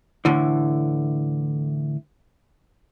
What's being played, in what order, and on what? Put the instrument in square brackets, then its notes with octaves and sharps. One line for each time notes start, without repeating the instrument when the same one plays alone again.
[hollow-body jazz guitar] A2 D3 E3